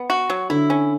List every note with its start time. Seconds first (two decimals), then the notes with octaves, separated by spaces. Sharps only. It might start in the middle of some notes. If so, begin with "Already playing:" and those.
Already playing: B3
0.10 F#4
0.30 F#3
0.50 D3 E4
0.70 C#4